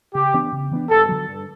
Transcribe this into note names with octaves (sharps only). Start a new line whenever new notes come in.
C#3 G4
E3 B3 D4
C#3
E3 B3 D4
G2 A4
D3 F#3
G2